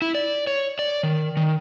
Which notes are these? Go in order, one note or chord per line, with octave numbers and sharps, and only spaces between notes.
E4
D5
C#5
D5
D#3
D#3